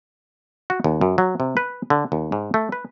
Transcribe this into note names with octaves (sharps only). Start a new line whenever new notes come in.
F#4
D#2
F#2
F#3
C3
B4
D3
D#2
G#2
A3
B4